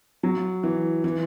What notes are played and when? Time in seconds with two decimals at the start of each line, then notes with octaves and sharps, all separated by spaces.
0.23 F#3
0.63 E3
1.04 E3